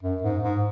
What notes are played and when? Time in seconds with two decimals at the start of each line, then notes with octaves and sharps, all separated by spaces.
0.03 F#2
0.22 G#2
0.42 G#2